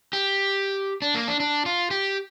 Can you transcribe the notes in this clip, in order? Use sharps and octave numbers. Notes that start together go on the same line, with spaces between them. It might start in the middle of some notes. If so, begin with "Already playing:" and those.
G4
D4
A#3
D4
D4
F4
G4